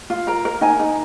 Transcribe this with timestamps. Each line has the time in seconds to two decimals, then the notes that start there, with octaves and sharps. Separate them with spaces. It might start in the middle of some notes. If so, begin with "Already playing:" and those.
0.10 F4
0.27 A#4 A#5
0.45 A#4
0.61 D#4 G#5
0.80 D#4